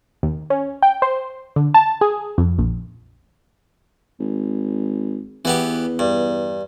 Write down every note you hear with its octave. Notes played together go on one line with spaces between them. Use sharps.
D#2
C#4
G5
C5
D3
A5
G#4
F2
A#1
G#1
E2 E3 B3 G4
G2